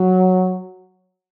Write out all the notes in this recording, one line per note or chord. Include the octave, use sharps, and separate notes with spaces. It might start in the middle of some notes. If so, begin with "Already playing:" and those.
Already playing: F#3